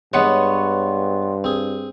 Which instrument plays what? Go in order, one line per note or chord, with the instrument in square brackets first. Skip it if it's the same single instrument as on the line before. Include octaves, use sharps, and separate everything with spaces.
[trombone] G2 [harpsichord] G#3 F#5 [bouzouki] B3 C#5 [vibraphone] C6
[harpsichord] C4 G#4